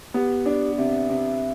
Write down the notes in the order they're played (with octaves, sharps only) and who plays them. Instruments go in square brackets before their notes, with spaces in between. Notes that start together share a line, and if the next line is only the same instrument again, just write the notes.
[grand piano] B3 [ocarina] G4
[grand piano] D4
[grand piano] C3 [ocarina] E5
[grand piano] C3